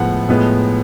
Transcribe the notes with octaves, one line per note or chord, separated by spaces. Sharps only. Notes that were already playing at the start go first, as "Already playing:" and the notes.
Already playing: A2 F3 G#3 B3 F#5
A2 F3 G#3 B3